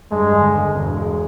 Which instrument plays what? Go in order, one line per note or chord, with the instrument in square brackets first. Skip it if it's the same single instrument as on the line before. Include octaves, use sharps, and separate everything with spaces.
[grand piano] G2 [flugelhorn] G#3
[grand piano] G1
G1
E1
G#3